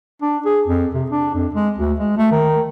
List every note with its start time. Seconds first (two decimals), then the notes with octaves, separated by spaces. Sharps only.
0.22 D4
0.45 G#4
0.68 F2
0.95 C3
1.10 D4
1.35 F2
1.55 G#3
1.78 D2
2.00 G#3
2.17 A3
2.32 D#3